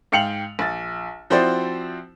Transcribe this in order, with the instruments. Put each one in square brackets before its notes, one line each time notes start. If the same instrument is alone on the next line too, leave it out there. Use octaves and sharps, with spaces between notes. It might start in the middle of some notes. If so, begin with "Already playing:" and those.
[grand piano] G#2 F5 G5 C#7 F7 F#7
A#1 A6
F3 C4 E4 F#4 C5 D5